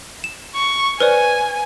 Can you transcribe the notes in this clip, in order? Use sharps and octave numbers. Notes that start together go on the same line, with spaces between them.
E7
C#6
B4 C5 D5 G#5